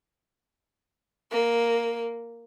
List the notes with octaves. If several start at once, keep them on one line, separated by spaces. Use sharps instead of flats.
A#3